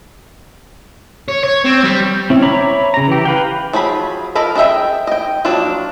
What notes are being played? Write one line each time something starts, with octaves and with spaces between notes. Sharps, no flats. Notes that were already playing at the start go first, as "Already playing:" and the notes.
C#5
C#5
C4
G3
C4 C#4 E4
C#5 E5 A#5 B5 D6
C#3 A#5
E3 G4
B4 F5 G5
F3 F#3 G#4 B5
F3 A4 A#4 D#5 B5
D4 G#4 D#5 E5 G5
D#5 G5
F3 F#3 A#3 D4